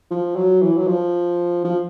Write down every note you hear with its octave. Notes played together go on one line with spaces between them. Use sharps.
F3
F#3
E3
F#3
F3
F3